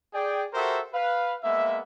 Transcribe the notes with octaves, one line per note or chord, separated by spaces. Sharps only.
G#4 D5 G5
F#4 G4 A4 A#4 C5 E5
B4 F5
G#3 A#3 B3 E5